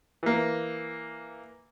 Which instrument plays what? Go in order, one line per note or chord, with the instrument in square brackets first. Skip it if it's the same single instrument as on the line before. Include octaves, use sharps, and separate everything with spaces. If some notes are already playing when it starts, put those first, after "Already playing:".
[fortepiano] E3 A#3